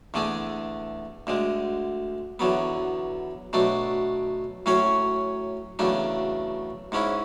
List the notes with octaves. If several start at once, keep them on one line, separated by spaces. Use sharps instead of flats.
E2 D3 A3 D4 G#4
D2 D3 G#3
E2 D3 F#3 B3
B2 F#3 A3 D4
A2 F#3 C#4 F#4 C#5
E2 C#3 F#3 A3 D4
G#2 G#3 C#4 E4